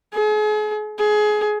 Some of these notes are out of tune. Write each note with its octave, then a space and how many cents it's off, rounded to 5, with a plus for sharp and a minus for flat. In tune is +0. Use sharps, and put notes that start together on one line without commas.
G#4 +40
G#4 +25